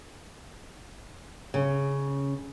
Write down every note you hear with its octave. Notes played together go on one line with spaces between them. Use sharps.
C#3